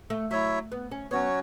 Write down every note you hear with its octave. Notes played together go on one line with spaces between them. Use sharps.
A3
F#3 E4 C#5 E5
B3
C#4
F#3 B3 C#4 F#4 C#5